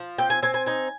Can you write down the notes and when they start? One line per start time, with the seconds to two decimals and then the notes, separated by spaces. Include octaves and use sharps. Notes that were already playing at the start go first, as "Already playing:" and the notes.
Already playing: F3
0.19 C4 G5
0.30 G#5
0.42 C4 G#5
0.54 G#5
0.66 D#4 G#5